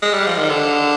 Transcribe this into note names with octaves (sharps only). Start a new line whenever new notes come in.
G#3
G3
F3
D#3
D3